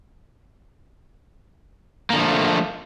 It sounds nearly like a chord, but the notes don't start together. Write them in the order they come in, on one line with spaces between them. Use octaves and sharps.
A#3 D3 F3 A3